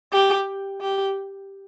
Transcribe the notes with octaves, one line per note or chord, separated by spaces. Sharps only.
G4
G4